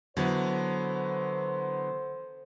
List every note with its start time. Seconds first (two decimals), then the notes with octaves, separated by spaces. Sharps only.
0.17 D3 F#3 B3 E4 C5